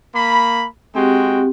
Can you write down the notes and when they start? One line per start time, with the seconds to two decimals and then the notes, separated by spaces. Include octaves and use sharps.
0.14 A#3 B5
0.95 G#3 C4 F#4 G4 G5